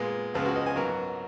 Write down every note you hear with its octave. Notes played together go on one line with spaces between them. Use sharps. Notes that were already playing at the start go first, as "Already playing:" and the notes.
Already playing: A#2 G#3 B3
C#2 C#3 F3 G#3 B3 F4
F#4
D#5
G#5
G#2 F#3 B3 A#4